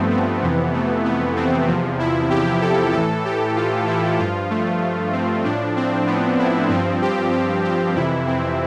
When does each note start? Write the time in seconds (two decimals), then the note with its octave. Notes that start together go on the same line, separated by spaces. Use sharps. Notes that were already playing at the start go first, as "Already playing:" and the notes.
Already playing: G2 F3 A3 B3 C4
0.11 B3
0.42 F2 C3 E3
0.74 A3
1.05 B3
1.36 C4
1.67 E2 C3 F3
1.99 E4
2.30 G4
2.61 A4
2.93 A2 E3 A4
3.25 G4
3.56 F4
3.87 E4
4.19 G2 F3 F4
4.50 A3
5.13 C4
5.44 A2 F3 D4
5.76 C4
6.07 B3
6.39 E4
6.69 G2 F3 C4
7.02 G4
7.32 G4
7.65 G4
7.95 F2 C3 E3 E4
8.27 C4